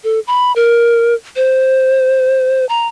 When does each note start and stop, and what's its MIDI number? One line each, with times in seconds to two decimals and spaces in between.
0.04 0.20 69
0.27 0.52 83
0.56 1.14 70
1.36 2.65 72
2.69 2.88 82